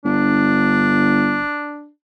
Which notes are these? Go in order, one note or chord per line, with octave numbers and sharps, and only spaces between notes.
G1 D4